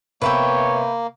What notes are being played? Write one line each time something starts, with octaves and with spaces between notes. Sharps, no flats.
C3 A#3 B3 B4 C#5 E5 G5